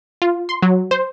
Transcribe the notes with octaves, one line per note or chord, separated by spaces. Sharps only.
F4
C6
F#3
C5